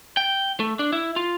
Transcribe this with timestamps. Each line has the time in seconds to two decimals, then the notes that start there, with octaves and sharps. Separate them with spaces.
0.17 G5
0.60 A3
0.79 D4
0.93 E4
1.16 F4